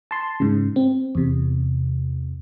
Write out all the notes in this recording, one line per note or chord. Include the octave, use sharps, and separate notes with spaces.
A5 C6
G#2 C#3
C4
E2 C3